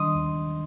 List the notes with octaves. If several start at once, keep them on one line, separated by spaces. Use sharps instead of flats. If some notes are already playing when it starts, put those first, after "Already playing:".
Already playing: D#3 D4 D#5 C6 D#6
D#2